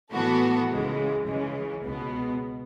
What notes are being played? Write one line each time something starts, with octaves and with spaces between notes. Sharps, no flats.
A2 E3 B3 F#4 A4
C#2 C#3 E3 G#3
C#2 C#3 E3 G#3 C#4
C#2 B2 G#3 B3